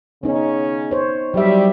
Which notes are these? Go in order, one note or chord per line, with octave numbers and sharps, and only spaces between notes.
C#3 B3 C#4 D#4
C5 C#5
F#3 G3 E5